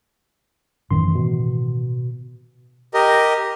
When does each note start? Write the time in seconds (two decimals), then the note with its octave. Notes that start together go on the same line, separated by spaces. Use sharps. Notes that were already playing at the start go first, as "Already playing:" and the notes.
0.91 F#2 A2 D#3 E3 C6
1.15 B2
2.94 G4 A#4 D#5